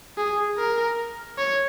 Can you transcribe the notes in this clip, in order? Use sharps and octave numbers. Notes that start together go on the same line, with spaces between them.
G#4
A#4
C#5